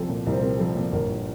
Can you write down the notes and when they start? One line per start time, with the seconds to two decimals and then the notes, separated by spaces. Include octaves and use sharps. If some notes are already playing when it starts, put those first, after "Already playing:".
Already playing: C2 F3 C4 A4
0.09 A#2
0.26 C2 A#4
0.33 C5
0.40 C4 A#4
0.59 F3 A4
0.76 A#2
0.92 G1 A#4